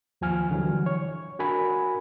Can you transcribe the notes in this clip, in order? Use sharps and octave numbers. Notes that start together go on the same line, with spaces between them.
D#2 F3 G#5 F6
D3 E3 F#3 G3
C#5
D4 F#4 A#4 G#5 B5